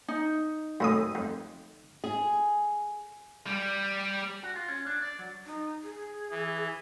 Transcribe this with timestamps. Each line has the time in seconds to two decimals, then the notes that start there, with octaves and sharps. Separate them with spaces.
0.08 D#4
0.80 F#2 A2 D#6
1.15 F2
2.04 G#4
3.47 G3
4.43 F#4
4.56 F4
4.68 C#4
4.86 D4
5.02 D5
5.19 F#3
5.46 D#4
5.83 G#4
6.31 E3